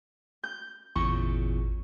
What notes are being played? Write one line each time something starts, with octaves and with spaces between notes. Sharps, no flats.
G6
G#1 E2 A#2 C#3 C#6